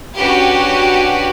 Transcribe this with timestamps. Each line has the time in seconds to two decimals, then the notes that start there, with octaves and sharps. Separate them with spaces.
0.18 C#4 D4 F#4 G4 B4